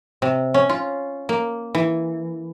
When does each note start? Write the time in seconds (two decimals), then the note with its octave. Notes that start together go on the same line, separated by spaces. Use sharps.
0.22 C3
0.54 C#4
0.69 F4
1.29 A#3
1.75 E3